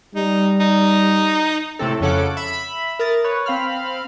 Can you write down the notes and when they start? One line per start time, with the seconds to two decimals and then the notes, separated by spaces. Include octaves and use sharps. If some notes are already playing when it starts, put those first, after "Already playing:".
0.15 G3 D#4
0.60 D#4
1.79 A2 C3 A3 C4 A4
2.01 F2 C#3 C#4 A4 F#5 D6
2.37 E5 B5
2.99 A#4 D#6 A6
3.24 B4 C#5
3.46 C4 F5 B5 F6